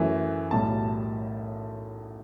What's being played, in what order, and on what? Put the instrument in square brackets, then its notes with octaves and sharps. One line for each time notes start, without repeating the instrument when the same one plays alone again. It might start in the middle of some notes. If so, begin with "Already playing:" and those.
Already playing: [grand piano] F#2 E3 A3
B1 A2 G3 A5